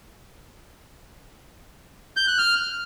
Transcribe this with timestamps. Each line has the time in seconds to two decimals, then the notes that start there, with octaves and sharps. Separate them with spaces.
2.17 G6
2.27 F#6
2.38 F6